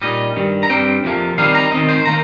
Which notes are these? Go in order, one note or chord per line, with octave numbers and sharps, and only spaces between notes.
A#2 G3 D#4 D#5
G2 D#3 G3
A#5
G2 G3 C4 G5
F2 C3 F3 A#3
D#3 G3 C4 D#4 F5
A#5
D#3 C4 D#4 D#5
C5
D#3 A#3 A#5